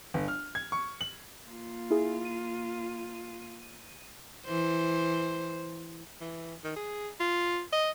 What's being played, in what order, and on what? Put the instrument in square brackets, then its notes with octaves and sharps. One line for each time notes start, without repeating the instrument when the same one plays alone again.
[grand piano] G1
F6
G#6
C#6
F#7
[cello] A#3 F4
[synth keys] E4 G#4
D#7
[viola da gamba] E3 C5
[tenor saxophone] E3
D#3
G#4
F4
D#5